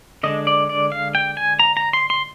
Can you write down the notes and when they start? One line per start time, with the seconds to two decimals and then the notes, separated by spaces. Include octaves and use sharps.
0.23 D3 G#3 D4 D#5
0.47 D5
0.69 D5
0.92 F5
1.15 G5
1.37 G#5
1.59 A#5
1.77 A#5
1.93 C6
2.10 C6